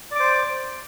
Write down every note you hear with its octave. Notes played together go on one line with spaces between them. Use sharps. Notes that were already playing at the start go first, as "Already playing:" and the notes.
C5 D5 D6